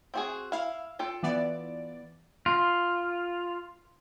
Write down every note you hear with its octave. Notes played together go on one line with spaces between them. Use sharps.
C4 F#4 G#4
E4 F5
F4 A4 G5
E3 B3 D5
F4